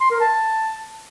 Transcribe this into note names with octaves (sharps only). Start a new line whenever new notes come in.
C6
A#4
A5